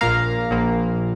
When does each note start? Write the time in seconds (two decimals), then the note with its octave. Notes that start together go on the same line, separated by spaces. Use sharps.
0.01 A#1 A#2 A#3 F5 A#5
0.51 A#1 A#2 A#3